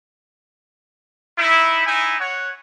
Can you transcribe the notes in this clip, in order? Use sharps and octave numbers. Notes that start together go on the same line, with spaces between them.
D#4 E4
D#4 E4 G#5
C#5 F#5